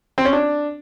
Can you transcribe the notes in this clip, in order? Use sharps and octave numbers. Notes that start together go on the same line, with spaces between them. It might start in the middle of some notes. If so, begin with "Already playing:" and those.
C4
C#4
D4